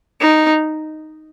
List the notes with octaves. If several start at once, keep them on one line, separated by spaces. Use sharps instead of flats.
D#4